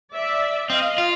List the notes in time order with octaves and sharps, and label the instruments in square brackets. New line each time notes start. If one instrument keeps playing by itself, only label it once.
[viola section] D5 E5
[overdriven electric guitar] C4 [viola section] D#5 F5
[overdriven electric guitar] F4